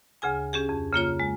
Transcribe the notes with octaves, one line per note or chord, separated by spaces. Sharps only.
D2 C#3 G#4 G#5
C#4 G4 G#4
F2
C#3 A#3 F4 C#5
G#3